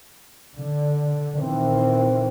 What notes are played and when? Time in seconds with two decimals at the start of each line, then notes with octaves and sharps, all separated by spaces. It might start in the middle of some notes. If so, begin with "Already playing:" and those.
0.57 D3
1.38 A#2 D#3 E3 C4